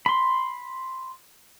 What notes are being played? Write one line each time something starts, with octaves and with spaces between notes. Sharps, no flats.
B5 C6